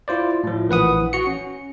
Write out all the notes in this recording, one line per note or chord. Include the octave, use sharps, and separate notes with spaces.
E4 F4 C5 D5
A2 F3
A#1 E3 B4 F#5 D#6
F#4 C#7
C#4